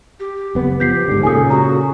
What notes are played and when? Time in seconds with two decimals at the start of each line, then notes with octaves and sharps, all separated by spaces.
0.20 G4
0.55 F#1 B3
0.80 F3 G4 G6 B6 C7
1.08 G#2 D3
1.23 A#2 C#3 A4 G#5 D#6
1.50 F#4 A#5